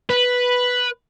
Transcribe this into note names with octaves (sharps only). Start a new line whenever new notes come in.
B4